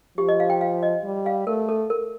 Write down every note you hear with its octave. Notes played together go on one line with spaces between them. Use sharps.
F3 G4
D#5
F5
G5
F5
D#5
G3
F5
A3 A#4
A4
A#4